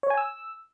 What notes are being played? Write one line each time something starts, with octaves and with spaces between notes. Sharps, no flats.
C#5
G#5
E6